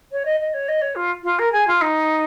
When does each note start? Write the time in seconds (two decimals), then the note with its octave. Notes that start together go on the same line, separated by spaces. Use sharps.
0.11 C#5
0.25 D#5
0.40 D#5
0.53 C#5
0.68 D#5
0.81 C#5
0.95 F4
1.23 F4
1.38 A#4
1.52 G#4
1.67 F4
1.81 D#4